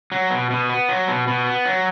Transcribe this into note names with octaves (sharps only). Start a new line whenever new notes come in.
F#3
B2
B2
B3
F#3
B2
B2
B3
F#3